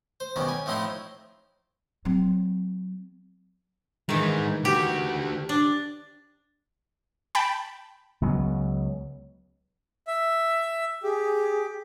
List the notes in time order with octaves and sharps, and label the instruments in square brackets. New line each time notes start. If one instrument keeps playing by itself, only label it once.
[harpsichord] C5
B1 B2 D#3 G3 C#4
G#5
A2 F3 C4 D#4 E4 C6
[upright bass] F#3 C4
[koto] D#3 E3 [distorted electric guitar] G#3 D#4
[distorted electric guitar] D3 F#4 [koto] G4
[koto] D4
[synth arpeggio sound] G5 A5 B5
[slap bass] C#2 F#3 B3
[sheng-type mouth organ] E5
[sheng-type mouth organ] G4 [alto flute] G#4